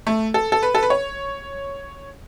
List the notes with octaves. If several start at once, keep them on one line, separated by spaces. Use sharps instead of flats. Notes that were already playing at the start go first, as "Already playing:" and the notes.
A3
A4
A4
B4
A4
B4
C#5